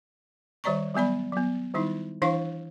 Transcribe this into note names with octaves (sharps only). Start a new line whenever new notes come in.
D#3 G3 C#5 D5 A#5 C#6
F#3 G3 B3 D5 B5
F#3 B3
D#3 G3 D#4 E4
E3 D4 E4 C5 F5 C#6